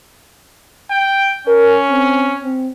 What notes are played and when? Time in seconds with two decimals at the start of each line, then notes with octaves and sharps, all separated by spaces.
0.91 G5
1.47 C#4 A#4
1.90 C4
2.43 C4